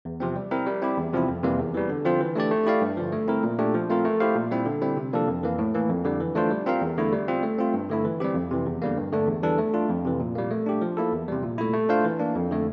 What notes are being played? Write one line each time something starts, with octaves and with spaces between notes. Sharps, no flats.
E2
C3 F3 C4
G3
C4 E4 A#4
G3
C4 E4 G4
E2
C3 F3 C4 E4
F2
C3 E3 G3 A#3
E2
E3 G3
D3
F3 C4 F4 C5
E3
A3 D4 G4 D5
A3
E4 G4 D5 F5
G2
D3 F3
A3
C4 E4 A#4
A#2
A3 D4 G4
F3
A3 C4 F4 A#4
A3
E4 G4 C5 F5
A#2
G3 C4 E4
D3
G3 C4 E4
C3
F3 A#3 D4 A4
F2
E3 A#3
A2
E3 A#3
F2
D3 G3
E3
A3 D4 F4 C5
G3
C4 F4 A#4 F5
E2
D3 A3 E4
G3
C4 F4
A3
C4 F4
G2
D3 A3 E4
E3
G3 C4 G4
F2
C3 E3
E2
D3 G3 A#3
G2
D3 A3 D4
E2
E3 G3 D4 A4
A3
D4 F4
F2
C3 E3
A#2
G3 A#3
A3
D4 G4
F3
A#3 E4 A4
E2
C3 G3
A#2
A3 E4
A3
D4 F4 C5 F5
E3
A#3 D4
F2
D3 A3